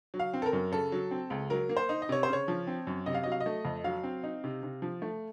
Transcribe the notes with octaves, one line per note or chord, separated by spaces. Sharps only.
F#3
F5
C4
A4
A#4
F#2
C#3 A4
F#3
C4
C#2
F#3 A#4
A#3
C5
D#4
D#5
C3 C#5
C#3 C5
C#5
F3
C4
F#2
C3 D#5
F5
F#3 D#5
F5
D#5
A3
F2
F#3 F5
C4
D#4
C3
C3
F3
A3